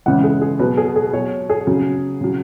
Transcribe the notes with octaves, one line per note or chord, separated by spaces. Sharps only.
C#3 E3 G#3 F#5
G#4
G#4
B2 F#3 B4
G#4
G#4
B2 F#3 C#5
G#4
C#3 F#3
C#3 F#3